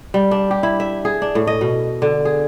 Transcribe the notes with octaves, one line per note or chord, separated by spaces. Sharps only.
G3
D4
G4
E4
E5
G#4
D4
A2
D#5
B2
D3
G#4